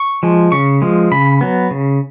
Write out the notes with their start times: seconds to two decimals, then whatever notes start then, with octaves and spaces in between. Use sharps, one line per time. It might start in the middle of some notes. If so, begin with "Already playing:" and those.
Already playing: C#6
0.23 F3 G#3
0.52 C#3 C#6
0.82 F3 G#3
1.12 C#3 B5
1.41 F#3 B3
1.71 C#3